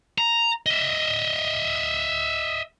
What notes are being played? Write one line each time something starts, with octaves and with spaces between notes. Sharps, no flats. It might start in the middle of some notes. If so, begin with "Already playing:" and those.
A#5
D#5 E5